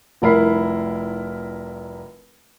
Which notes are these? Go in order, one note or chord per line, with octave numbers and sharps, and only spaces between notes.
F1 C2 E4 A#4 B5 C7